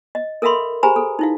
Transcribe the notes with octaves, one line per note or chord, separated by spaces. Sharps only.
D#5
A4 A#4 E5 F5 B5 C6
G4 G#4 C5 G#5 A#5 B5
A4
D#4 E4 F5